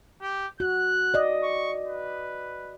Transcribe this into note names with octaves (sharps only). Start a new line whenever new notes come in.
G4
F#4 F#6
D5 D#5
C#6
B4